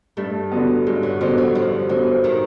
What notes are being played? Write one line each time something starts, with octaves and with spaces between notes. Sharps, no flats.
G2 A3
D3 F#3 B3
G2 G#3
F#3
D3 F3 F#3 B3
F#3
G2 F3
D3 E3 F#3 B3
D#3